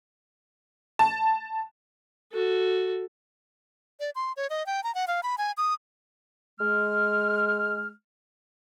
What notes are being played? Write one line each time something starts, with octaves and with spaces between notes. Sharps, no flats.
A5
F#4 A4
D5
C6
C#5
D#5
G5
A#5
F#5
F5
B5
G#5
D#6
G#3 F6